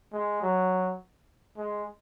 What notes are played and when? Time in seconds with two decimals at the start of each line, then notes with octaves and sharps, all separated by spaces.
0.13 G#3
0.42 F#3
1.57 G#3